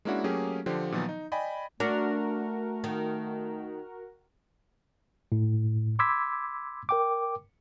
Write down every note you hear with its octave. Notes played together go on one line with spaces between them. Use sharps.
G#3 A#3 C#4 D4 E4 F#4
F#3 A3 A#3 C#4 G4 G#4
D3 F3 G4 C5
A#2 D#3 F3 F#3 B3
D#4
D5 D#5 G5 G#5 B5
A3 D4 F#4 A#4
D#3
A2
B5 C6 D6 E6 G#6 B6
A#4 G5 D6